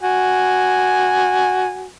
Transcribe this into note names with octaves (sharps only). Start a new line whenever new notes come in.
F#4 G#5